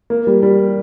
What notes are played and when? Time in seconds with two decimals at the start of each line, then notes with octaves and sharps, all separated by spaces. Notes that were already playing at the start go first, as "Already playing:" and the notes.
0.10 A#3
0.27 G3
0.43 G3